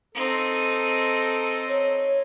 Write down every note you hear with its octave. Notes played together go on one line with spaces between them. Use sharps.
C4 D#4 A4
C#5